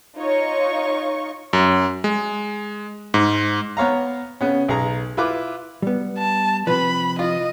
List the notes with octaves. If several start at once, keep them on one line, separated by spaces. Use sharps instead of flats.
D#4 F4 C#5 D#5 C#6
F#2
G#3
G#2
B3 C#5 F5 A#5
C#3 B3 C#4
B1 G#4 A#5
E4 F4 B4 D6
G3 B3
A5
C3 F3 B4 B5
F4 D#5